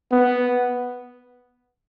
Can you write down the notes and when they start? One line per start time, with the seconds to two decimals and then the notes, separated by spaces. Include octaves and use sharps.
0.12 B3